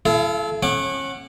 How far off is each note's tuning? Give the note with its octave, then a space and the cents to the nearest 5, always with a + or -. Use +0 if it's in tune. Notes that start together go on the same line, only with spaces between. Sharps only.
E4 +35 A4 -30 F5 -15
C#4 -35 F#5 +0 D6 +20